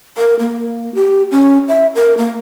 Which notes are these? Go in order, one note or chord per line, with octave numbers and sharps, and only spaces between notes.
A#4
A#3
G4
C#4
E5
A#4
A#3